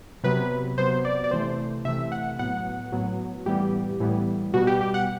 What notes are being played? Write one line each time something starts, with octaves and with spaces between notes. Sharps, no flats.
C3 F#3 B3 B4
C3 F#3 B3 C5
D5
D5
C3 E3 A3 C5
C3 E3 A3 E5
F#5
A2 F#3 B3 F#5
A2 F#3 B3
A2 E3 G3 B3 G4
A2 E3 G3 B3
B2 G3 B3 F#4
G4
G4
F#5